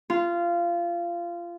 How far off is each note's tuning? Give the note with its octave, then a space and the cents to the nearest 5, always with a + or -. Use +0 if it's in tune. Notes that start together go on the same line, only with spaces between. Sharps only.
F4 -20